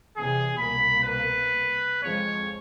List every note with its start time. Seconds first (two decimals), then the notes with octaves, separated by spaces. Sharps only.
0.17 E2 C3 G#4
0.58 C2 B2 A#3 B5
1.03 B4
2.03 F2 F3 G#3 C#5